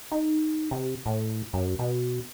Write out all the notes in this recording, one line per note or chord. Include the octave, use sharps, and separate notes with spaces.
D#4
C3
A2
F#2
B2